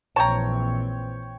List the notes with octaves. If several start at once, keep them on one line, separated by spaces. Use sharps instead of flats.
A#1 E3 C4 C#5 G5 A5 A#5